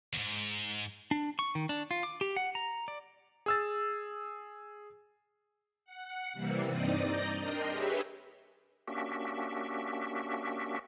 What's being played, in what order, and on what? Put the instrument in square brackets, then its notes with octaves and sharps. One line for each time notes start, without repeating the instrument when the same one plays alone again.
[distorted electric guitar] E2 G#2
[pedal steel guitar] D4
C#6
D#3
D4
F4
D6
G4
F#5
A#5
D5
[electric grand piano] G#4 E6 A6
[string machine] F#5 C#7
C3 E3 G3 A#3 C4
G2 C4 D#4 D5 D#6
D5 D#5 A#5 G6
D4 A#4 D#5 G5 C6
G4 G#4 B4 C#5 E5
[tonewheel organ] A#3 C#4 D4 F#4 G4 E5